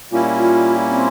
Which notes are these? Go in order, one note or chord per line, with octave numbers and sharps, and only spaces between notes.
A#2 G3 A#3 C#4 E4 F4
F4
C4